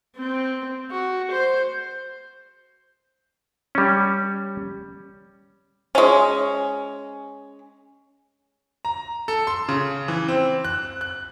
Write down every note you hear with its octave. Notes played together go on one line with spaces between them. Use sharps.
C4
F#4
C5
G3 C#4
G#3 C#4
A#5
A4
C6
C#3
E3
C4
F#6
F#6